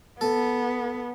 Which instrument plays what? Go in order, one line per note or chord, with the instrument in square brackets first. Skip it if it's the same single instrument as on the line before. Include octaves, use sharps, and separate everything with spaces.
[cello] B3 [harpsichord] A4